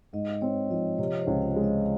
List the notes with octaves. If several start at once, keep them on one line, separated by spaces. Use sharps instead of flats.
G#2 D#5
C4 C#5
F3 D#5
C3 C#5
C5
C#2
F5
G#3
D#5